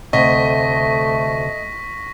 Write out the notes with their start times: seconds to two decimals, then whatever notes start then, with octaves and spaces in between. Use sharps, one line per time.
0.13 D2 C3 A3 D#5 C#6 A#6 B6